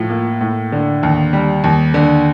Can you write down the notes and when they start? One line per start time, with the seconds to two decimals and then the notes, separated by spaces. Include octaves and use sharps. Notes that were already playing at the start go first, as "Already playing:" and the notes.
Already playing: A2 F3
0.10 A#3
0.41 A2
0.72 D3
1.03 D#2
1.33 G3
1.64 D#2
1.94 D3